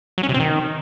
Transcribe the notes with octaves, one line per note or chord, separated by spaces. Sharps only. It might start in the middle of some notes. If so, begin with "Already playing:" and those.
F#3
C#4
C3
C4
D#3